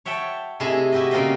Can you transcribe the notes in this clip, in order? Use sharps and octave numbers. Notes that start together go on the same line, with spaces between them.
C#5 E5 F#5 G5 A5
C3 A3 E4 G#4 D#5
E4 F#4 G4 B4 D#5
C#3 A#3 C4 F4 C5 D#5